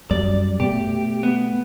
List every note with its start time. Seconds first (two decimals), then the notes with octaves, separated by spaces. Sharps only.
0.11 F#2 G3 D5
0.60 B2 A3 G4
1.23 B3